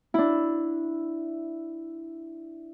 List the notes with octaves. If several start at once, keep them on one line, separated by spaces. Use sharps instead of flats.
D4 E4